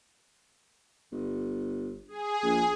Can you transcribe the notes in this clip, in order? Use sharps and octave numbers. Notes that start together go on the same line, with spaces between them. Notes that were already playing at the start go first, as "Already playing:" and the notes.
G1
G#4
A#1